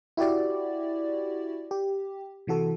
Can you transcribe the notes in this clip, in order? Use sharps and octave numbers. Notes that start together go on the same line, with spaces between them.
E4 F#4 G4 D5
G4
C3 E3 F#4 A4